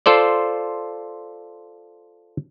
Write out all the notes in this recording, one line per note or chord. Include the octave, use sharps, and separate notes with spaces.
F4 A4 C5 D5